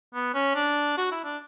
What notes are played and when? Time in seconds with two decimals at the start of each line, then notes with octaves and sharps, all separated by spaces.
0.14 B3
0.34 C#4
0.55 D4
0.98 F#4
1.12 E4
1.24 D4